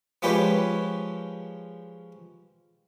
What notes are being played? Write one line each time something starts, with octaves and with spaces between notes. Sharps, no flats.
F3 G#3 C#4 G4 B4 C#5